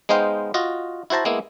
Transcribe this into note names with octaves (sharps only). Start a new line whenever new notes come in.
G#3 B3 D#4 C5 F5 G5
F4 F#4 D#5
E4 F#4 C5 A5 A#5
G#3 A#3 B3 E4